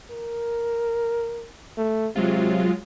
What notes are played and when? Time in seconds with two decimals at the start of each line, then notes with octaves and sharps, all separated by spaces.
0.11 A#4
1.78 A3
2.16 C3 F#3 G#3 F4